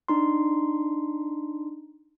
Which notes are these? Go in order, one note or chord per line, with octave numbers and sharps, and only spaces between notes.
D4 D#4 C6